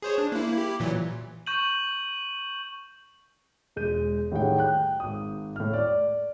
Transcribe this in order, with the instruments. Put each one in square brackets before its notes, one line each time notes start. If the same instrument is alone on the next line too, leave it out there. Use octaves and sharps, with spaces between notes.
[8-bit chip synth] G#4 C5 C#5
D4
A#3 E4
E4 G4
A#2 E3 F#3
[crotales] C#6 G6 D#7 F#7
[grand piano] E1 G#3 G6 D#7
A2 D#3 G3 G#4 F#5 G5
G5 F#6
G#1 D#6
A2 F6
D5